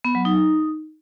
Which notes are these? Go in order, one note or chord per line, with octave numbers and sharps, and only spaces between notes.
B3
F#3
D#4